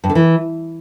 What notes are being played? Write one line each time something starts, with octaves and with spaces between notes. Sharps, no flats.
G2
D3
E3